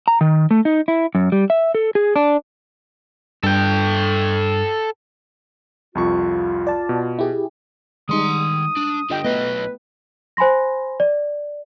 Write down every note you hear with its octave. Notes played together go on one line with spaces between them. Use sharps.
A#5
D#3
A3
D#4
E4
F#2
G3
E5
A4
G#4
D4
G2 A4 G5
C2 F2 F4 C#6
D5 A5
B2
E4 G4 G#4
D#3 G3 G#3 D#4 C6 D#6
D4
D3 G3 F4 D#5 G5
B1 A3 B3 B4 D#5
C5 G#5 B5 C6 A#6
D5